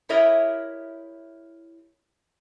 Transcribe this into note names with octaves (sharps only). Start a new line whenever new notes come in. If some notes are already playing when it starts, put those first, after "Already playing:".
E4 G4 A#4 C#5 D#5 E5